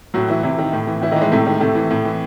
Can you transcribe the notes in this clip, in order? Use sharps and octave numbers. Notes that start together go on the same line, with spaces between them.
A2 F#3 F#4
E3 E4
C3 E3 E4
D#3
A2
E3
A2 E3 E4
D#3 D#4
E3
G#3
A2 C3 A3
D#3 G#3
A2 C3 A3
E3
A2
E3